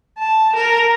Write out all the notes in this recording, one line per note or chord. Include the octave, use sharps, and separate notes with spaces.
A5
A#4